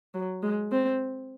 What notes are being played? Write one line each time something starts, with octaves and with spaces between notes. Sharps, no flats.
F#3
G#3
C4